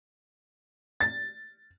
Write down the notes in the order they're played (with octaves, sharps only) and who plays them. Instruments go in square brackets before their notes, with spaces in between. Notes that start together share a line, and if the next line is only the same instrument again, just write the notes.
[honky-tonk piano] A6